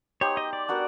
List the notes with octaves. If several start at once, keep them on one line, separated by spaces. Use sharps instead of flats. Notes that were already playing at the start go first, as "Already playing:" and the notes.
B3 D#4 G4 C5 C#5
D#5
D5
B3 D4 F#4 A#4